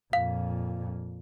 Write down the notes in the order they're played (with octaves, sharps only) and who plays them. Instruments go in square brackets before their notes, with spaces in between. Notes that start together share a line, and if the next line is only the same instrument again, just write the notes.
[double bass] F2 A#2 [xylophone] F5